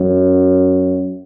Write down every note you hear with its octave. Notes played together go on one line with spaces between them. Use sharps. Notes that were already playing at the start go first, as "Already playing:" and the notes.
Already playing: F#2